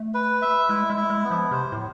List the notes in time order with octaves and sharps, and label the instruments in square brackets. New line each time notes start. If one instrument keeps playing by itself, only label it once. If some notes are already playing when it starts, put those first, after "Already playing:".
Already playing: [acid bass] A3
[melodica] B4
E5
[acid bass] G#3 [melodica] E4
[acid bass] G#3
[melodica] E4
[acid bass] G#3
[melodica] B3
[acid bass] F3
[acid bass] C3 [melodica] C5
[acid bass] A2